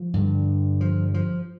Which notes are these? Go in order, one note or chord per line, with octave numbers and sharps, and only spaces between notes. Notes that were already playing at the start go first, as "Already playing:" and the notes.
Already playing: F3
G2 D3
F3
F3